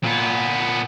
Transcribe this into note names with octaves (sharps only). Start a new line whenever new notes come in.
A#2 B3